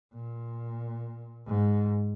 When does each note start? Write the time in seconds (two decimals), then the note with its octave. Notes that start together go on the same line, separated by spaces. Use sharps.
0.14 A#2
1.47 G#2